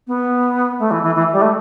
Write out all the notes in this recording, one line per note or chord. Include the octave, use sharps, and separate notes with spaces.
B3
A3
E3
E3
E3
G3
A3